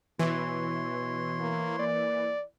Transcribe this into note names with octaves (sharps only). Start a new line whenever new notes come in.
B2 E3 C#5 C6
A#3
A#3 D5